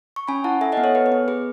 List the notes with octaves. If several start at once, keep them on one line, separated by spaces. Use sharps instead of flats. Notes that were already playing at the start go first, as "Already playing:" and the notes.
C#6
C#4 G#5 B5
E4 F#5 A5
A4 E5 G#5
D#5 F#5
B3
A4 C#5
B3 B4
B4
B3
G#4 B4